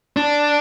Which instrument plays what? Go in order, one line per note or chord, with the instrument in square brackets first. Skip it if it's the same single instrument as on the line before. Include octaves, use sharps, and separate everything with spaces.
[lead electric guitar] D4